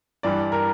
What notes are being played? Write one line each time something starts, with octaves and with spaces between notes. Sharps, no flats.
G2 E3 G3 D5
A#4